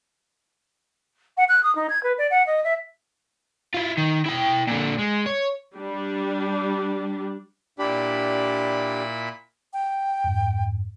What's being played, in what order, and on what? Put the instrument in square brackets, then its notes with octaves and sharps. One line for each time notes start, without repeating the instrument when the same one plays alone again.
[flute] F#5
F#6
D#6
D#4
G#6
B4
D5
F#5
D#5
E5
[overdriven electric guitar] E4 F4
D#3
E4 G5
A#2 D3
G#3
C#5
[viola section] G3 D4
[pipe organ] A#2 E4 B5 [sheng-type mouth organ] D4 G4
[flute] G5
[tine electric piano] F2 G#2